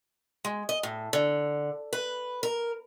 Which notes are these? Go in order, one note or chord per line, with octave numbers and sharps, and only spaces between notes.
G#3
D#5
A2
D3
B4
A#4